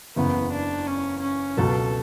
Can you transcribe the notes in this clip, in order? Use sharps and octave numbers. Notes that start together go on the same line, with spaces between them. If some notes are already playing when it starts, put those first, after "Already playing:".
F#1 E2 C#3 B3
D4
C#4
C#4
C#2 B2 F#3 A4